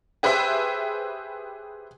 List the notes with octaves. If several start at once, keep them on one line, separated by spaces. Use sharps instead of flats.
G4 G#4 B4 C5 E5